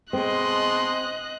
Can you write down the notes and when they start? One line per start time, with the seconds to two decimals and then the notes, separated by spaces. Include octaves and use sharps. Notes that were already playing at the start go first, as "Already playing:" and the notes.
0.13 B2 G#3 C4 D#5 C6 F#6